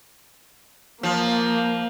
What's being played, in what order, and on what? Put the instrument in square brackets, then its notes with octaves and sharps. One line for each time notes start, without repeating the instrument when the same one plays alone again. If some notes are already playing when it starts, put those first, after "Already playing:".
[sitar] F3 [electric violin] A#3